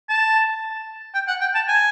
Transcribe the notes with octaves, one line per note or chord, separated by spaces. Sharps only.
A5
G5
F#5
G5
A5
G#5